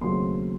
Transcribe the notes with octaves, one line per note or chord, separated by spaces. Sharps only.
D#2 C#3 F#3 A3 C4 C6